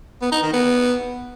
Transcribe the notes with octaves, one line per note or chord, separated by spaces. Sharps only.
B3
D#4
D#3
B3